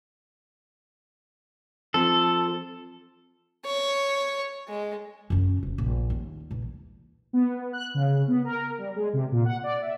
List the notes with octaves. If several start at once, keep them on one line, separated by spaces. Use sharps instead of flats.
F3 C4 A4
C#5
G#3
F#2 C#4
E1
A#1
D#2
A#1 E3
B3
F#6
C#3
B3
A#4
G3
G#3
C3
A#2
F#5
D5
E5